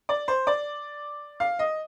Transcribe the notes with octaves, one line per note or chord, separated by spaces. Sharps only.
D5
C5
D5
F5
D#5